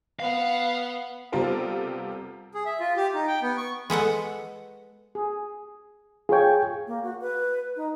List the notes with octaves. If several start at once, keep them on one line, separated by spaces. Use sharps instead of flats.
B3 F5 F#5
C3 G3 B3 F4 A4 A#4
G#4
E5
F4
G4
D#4
G5
B3
C#6
G#3 B3 A4 F#5
G#4
F4 G#4 C#5 G5
A#3
F#4
B4
D#4